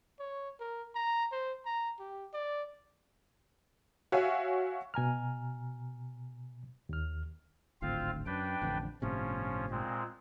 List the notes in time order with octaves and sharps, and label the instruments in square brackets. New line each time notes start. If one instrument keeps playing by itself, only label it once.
[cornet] C#5
A#4
A#5
C5
A#5
G4
D5
[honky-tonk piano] F#4 C#5 E5 F5 G#5
[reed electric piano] B2 G#5 A#5 F6
D#2 F6
[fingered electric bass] D1 G#1 D2 [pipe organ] C4 F4 F5
[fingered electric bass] F#2 [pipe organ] D4 B4 G5
[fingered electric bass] A1 F2 D3
[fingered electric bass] G1 A2 C3 [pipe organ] F3 C#4
[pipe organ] A#2 G#3 C4